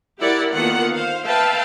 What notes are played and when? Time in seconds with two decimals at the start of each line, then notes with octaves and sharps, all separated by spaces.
0.20 E4 G4 A#4 D5 F#5
0.52 D3 D#3 A#3 B3 F4 F#5
0.94 C5 F5
1.26 B4 E5 F5 G5 A5